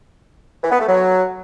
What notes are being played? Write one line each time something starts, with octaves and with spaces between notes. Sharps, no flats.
E3
B3
A3
F#3